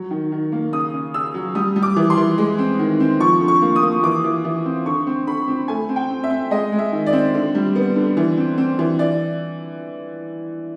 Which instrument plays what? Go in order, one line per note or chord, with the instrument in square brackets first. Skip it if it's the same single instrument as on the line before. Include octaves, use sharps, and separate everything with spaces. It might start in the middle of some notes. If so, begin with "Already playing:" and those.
Already playing: [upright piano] F#3
D#3
D#3
A#3
C#3 D#6
C#3
C#3 E6
F#3
G3 D#6
G3
D6
E3
C6
E3
G#3
C4
D#3
C4
F3 C#6
D3
C#6
A#3
D#6
A#3
E3 D6
E3
E3
C4
D3 C#6
C4
D3 B5
C4
A3 G#5
C4
G5
C4
E5
C4
G#3 D#5
G#3
E5
D#3
D5
C4
D3
G3
B3
D3
E3
C4
C4
E3
E3 D5